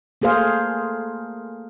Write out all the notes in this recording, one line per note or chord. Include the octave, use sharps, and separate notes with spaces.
A3 A#3 G#4 C5 F5